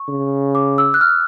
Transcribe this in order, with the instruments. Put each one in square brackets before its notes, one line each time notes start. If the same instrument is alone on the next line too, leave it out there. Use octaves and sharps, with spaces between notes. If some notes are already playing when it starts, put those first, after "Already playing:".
Already playing: [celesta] C#6
[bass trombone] C#3
[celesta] D6
E6
F#6
F6